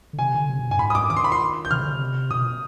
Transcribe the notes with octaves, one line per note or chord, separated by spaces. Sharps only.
D3
C3 G#5
D3
C3
B2
G2 G#5
G#2 B5
D#6
D6
D#3 D6
C6
B5
C6
G6
C3 F6
D3
C3
B2 D#6